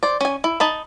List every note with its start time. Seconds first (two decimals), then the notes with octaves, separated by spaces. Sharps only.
0.03 C5 D5
0.21 C#4 G#5
0.44 E4
0.60 D#4 A5 B5